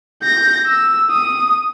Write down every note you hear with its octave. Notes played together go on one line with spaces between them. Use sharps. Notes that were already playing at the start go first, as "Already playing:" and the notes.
G6 A#6
E6
D#6